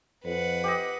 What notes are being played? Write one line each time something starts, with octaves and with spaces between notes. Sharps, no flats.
F2 B4 F#5
G4 D#5